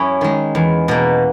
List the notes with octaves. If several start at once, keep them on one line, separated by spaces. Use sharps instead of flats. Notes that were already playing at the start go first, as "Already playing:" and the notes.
Already playing: F#2 C#4 E4
D#3 G#3
E2
B2 A#3